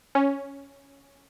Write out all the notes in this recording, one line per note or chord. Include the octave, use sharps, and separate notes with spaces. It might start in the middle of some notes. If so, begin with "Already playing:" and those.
C#4